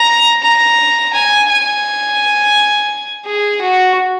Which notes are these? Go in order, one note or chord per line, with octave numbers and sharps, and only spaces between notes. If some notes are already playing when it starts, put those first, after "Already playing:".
Already playing: A#5
A#5
G#5
G#5
G#4
F#4